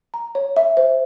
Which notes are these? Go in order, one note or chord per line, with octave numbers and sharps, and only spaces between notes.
A#5
C#5
E5
C5